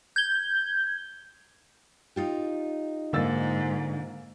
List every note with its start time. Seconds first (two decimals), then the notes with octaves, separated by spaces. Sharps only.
0.16 G6 G#6 G7
2.16 D#4 F4 G4
3.13 G#2 D3 A#3 E6 A6